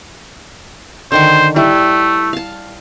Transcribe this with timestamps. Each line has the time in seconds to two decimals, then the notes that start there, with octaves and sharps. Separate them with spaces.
1.12 D3 D#3 C5 C#6
1.56 G3 A3 E4
2.33 F5 A5